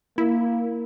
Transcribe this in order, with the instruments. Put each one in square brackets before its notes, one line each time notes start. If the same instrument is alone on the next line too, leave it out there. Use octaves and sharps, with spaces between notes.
[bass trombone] A#3 [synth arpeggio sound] E4